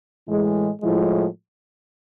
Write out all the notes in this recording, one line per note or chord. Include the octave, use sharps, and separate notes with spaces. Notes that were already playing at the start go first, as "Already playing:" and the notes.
A2 E3 G#3
A2 F3 G#3 E4